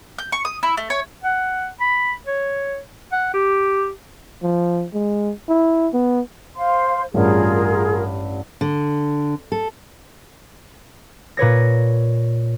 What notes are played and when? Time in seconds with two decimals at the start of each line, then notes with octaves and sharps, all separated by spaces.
0.18 G6
0.32 C#6
0.45 D#6
0.63 E4
0.77 A3
0.90 C#5
1.24 F#5
1.80 B5
2.27 C#5
3.12 F#5
3.34 G4
4.43 F3
4.94 G#3
5.49 E4
5.93 B3
6.56 C5 F5 C6
7.14 A1 G2 F4 G#4 A#4
8.61 D3
9.52 A4
11.37 A#2 B4 C#5 A#6